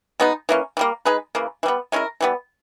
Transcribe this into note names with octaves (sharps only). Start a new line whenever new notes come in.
B2 G#3 B3 D#4
E3 A#3 C#4
E3 G3 A#3
G#3 D#4 G#4 B4
C#3 E3 A#3
E3
G3 B3
G#3 C#4 E4 A#4
E3 G3 B3